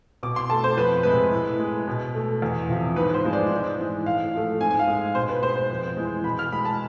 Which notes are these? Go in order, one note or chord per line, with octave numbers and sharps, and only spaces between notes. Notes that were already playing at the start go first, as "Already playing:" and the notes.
B2 D6
C6
A3 A5
C5
F2 B4
C3 G#3 B4
A2
G#3
B2
A3
E2
C3 F3
G#2 B4
C5
F3 G#3
D5
G#2
E3 G#3
A2 F5
F3 A3
G#2 G#5
G#5
F5
G#3
B2 C5
B4
G#3 C5
C5
F2
E3 G#3
B2 B5
F6
G#3 B5
A5